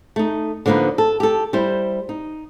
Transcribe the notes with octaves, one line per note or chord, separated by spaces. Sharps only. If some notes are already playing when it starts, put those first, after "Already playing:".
A3 D#4
D3 F3 A#3 D#4 B4
A4
G4 A4
G3 E4 C5
D#4